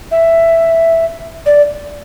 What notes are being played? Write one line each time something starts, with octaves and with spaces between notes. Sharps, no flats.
E5
D5